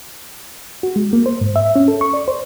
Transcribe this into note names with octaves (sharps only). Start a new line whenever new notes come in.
F#4
G#3
A#3
C5
G#2
E5
C#4
A4
C#6
D5
C5